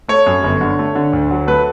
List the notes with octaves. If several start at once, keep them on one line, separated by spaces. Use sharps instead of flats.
A3 C#5
F#2
G1
D3
A3
D3
D2
F#3
A3 B4